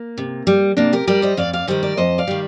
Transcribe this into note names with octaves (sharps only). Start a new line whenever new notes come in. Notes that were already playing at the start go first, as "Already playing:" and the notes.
Already playing: A#3
C3
G3
C3 A#3 D4
G4 A#4
G3 A#4 D5
C5 D#5
F2 D5 F5
D5 F5
D#3 G3 C5 D#5
A#4 D5
F2 C5 D#5
D5 F5
D#3 G3